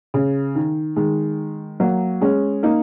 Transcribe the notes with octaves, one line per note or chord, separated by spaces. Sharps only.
C#3
D#3
D#3 G#3
F#3 A#3
G#3 C#4
A#3 D#4